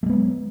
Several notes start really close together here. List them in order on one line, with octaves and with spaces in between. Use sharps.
A3 G#3 B3 F#3